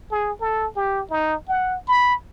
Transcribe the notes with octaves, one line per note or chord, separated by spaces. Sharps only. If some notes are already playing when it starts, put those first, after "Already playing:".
G#4
A4
G4
D#4
F#5
B5